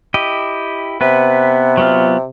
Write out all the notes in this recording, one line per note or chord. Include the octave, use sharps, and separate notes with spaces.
E4 G4 D#5
C3 B3 B4
F#3 B3 F4